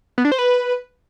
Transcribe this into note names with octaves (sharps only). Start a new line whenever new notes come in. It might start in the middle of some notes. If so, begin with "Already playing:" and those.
B3
D4
C5
B4